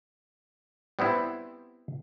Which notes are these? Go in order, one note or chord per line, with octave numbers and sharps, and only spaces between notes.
G3 B3 C4 E4